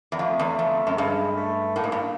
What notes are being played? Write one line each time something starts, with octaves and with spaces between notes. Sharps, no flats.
E2
F2 A3
E2
F2
F#2
G2 G#3
A3
A2 A#3
G#2
G2